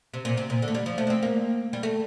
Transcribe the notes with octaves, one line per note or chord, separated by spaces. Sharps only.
C3
A#2
C3
A#2
D3
A3
G3
F3
A3
D4
C4
A#3
G3
A3